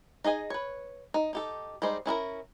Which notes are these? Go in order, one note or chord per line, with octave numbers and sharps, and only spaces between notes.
D#4 G#4 D#5 G#5
B4 C#5
D#4
D#4 G4 A4
G3 G#3 D#4 C5
C#4 E4 F4 A#4